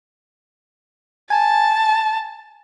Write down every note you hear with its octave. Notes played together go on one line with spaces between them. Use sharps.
G#5 A5